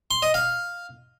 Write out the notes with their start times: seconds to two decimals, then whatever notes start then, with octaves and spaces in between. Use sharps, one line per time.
0.11 C6
0.22 D#5
0.34 F5